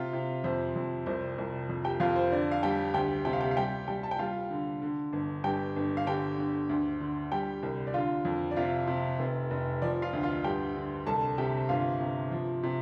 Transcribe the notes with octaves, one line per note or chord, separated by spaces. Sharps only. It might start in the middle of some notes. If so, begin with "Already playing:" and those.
Already playing: C3 F4 F5
C3
F2 C5
F2
C2 C5
C2
F2
G4 G5
F2 F4 F5
C5
D3 D5
F5
G3 G4 G5
D2 G4 G5
C3 G5
F5
G4 G5
F5
G3 G4 G5
G3 G4 G5
A5
G5
G3 F4 F5
D3
D3
G1
G2 G4 G5
G1
F5
D3 G4 G5
D3
D2
D3
G3 G4 G5
C2
D5
D3 F4 F5
F2
D5
C3 F4 F5
C3
F1
F1
F3 D5
F4 F5
D2
F4 F5
G2 G4 G5
D3
C2 A4 A5
C3 G4 G5
G1 F4 F5
C3
F3
C3